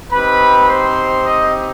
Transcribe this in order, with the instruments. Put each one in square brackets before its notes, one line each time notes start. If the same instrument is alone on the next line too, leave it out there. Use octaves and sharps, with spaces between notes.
[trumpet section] C4 D#4 G4 B4 B5
C5 C6
D#5 D#6